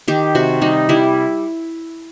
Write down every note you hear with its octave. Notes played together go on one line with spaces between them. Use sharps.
D#3 G4
C3 F#4
G3 D#4
G3 E4